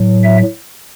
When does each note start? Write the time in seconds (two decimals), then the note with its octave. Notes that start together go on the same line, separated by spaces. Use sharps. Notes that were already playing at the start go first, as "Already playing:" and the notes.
Already playing: A2 F#3
0.24 E5